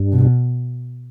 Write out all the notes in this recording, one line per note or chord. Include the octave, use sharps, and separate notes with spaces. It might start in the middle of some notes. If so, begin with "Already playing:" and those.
Already playing: G2
B2